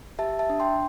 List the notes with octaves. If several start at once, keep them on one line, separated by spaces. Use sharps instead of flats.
G4 E5 A5
E5 A5
D4
G5 C6